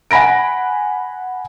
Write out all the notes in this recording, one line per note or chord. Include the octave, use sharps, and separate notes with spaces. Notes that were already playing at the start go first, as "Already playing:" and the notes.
F#5 G#5 B5 A#6 D7